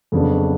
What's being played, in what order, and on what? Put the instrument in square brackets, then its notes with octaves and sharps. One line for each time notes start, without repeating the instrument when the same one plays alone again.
[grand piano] F2 C#3 F#3 B3 D4